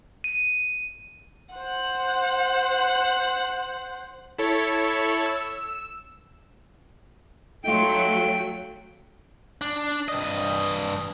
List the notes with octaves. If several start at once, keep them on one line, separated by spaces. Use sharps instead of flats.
D#7
C5 F#5
E4 A4 C#5
E6
F#3 A3 D#4 F4 A4 G5
D4
G2 D#5